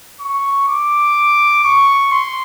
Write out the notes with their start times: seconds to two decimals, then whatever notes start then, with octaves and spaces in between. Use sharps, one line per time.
0.20 C#6
0.68 D6
1.64 C#6
2.11 C6